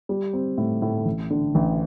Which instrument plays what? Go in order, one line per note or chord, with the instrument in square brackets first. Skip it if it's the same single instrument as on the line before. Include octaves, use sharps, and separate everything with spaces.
[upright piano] G3
C4
A2
A2
A1
D3
A1